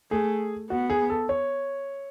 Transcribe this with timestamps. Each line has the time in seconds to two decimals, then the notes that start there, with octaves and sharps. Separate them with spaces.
0.11 A3 G#4
0.70 B3 F#4
0.90 G#4
1.10 A4
1.29 C#5